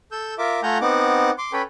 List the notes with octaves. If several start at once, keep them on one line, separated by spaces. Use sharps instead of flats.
A4 E6 G6
F4 A#4 E5 D6
A3 F4 F#5 G#5 A#5 G6
B3 C4 D#4 F#5 D6
C6 D6
C#4 A4 B4 C#5 G5 B5